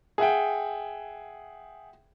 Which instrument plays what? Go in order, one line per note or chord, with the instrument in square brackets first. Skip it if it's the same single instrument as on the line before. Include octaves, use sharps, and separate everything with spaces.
[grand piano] G#4 E5 F#5 G5